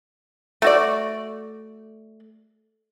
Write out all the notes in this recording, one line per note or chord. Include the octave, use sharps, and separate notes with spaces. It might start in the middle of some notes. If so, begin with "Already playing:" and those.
A3 F#4 D5